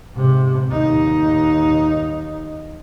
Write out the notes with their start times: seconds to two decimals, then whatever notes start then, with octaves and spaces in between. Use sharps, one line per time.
0.14 G#2 C3
0.71 D#2 D#4